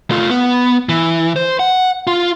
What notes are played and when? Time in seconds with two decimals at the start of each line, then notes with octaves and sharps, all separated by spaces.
0.11 A3 F4
0.30 B3
0.89 E3
1.36 C5
1.59 F#5
2.07 F4